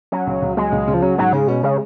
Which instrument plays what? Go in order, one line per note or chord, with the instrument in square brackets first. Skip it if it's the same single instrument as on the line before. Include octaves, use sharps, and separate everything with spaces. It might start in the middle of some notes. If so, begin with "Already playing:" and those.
[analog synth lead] F#3 [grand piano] C#4
[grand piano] C#2
C#2
[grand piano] F#3 [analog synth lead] G#3
[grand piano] C#2
C#3
[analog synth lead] F3
[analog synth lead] F#3 [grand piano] C#4
[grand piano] G#2 [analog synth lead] F#3
[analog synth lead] C#3 [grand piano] G#3
[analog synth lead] B2 [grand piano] C#4
[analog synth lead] C#3 [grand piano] G#3